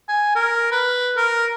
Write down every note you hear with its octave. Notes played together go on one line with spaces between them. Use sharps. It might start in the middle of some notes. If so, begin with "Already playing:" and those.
G#5
A#4
B4
A#4